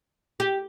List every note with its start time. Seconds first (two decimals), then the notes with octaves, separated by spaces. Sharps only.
0.40 G4